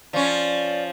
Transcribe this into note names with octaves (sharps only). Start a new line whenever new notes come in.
F3 C#4 D5